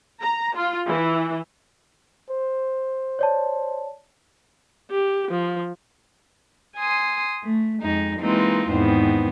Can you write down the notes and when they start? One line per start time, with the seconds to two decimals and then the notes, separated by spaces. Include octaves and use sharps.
0.22 A#5
0.56 F4
0.88 E3
2.30 C5
3.19 C#5 D5 A5
4.91 G4
5.30 F3
6.76 G#5 C6 D#6
7.43 A3
7.81 F2 G#3 D#4
8.19 E3 G#3 A#3 C4 D#4 F4
8.68 E2 G#2 D#3 B3 C4